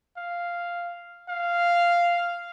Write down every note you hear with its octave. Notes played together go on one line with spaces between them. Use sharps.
F5
F5